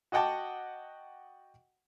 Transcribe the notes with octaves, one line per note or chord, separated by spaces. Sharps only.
F#4 D#5 F#5 G5 A5 D6